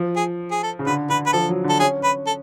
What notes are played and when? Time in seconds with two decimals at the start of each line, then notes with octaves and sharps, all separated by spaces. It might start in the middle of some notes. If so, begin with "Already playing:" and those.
Already playing: F3
0.16 G#4
0.51 G#4
0.63 A4
0.79 C#3
0.86 D3 B4
1.10 D3 B4
1.26 B4
1.33 F3 A4
1.49 F#3
1.64 D3
1.70 A4
1.80 C#4 G#4
2.00 C#4 B4
2.27 A4